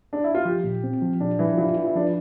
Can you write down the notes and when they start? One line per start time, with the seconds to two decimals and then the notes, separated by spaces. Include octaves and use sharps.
0.13 D4
0.24 E4
0.35 F4
0.45 F3 G4
0.64 A#2
0.84 C4
1.02 F3
1.20 A#2 D4
1.39 E3 F3
1.58 E3 F4
1.77 F4
1.86 E4
1.96 F3 D4